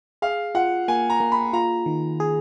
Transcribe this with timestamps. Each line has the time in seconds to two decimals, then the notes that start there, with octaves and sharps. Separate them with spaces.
0.22 G#4 F5
0.55 F4 F#5
0.88 A#3 G#5
1.10 A#5
1.20 A#3
1.32 B5
1.53 F4 A#5
1.86 D#3
2.20 G#4